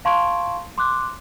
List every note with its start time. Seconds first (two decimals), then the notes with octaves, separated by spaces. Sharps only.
0.05 F5 A5 C6 C#6 G#6 D7
0.78 C6 D6 F#6